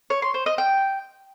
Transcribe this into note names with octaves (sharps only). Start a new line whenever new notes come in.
C#5
C6
C5
D#5
G5